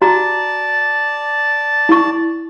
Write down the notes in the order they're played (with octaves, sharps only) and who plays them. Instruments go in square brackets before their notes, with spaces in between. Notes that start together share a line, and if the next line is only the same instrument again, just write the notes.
[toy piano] F#4 A#5 [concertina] D5 A5
[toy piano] E4 C#6